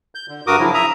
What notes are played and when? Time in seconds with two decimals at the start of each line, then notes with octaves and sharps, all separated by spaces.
0.15 G6
0.29 D3
0.47 G2 F#4 A#4 D6 D#6
0.59 C#3 F3 F#3 E4
0.74 E5 A#5 D#6